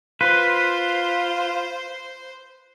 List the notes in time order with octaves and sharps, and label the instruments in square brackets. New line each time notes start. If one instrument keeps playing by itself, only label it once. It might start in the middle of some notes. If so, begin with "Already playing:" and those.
[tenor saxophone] F4 [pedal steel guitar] B4 [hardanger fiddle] C5